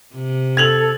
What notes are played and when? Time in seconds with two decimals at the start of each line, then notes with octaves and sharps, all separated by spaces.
0.15 C3
0.57 A4 G#6 F7 F#7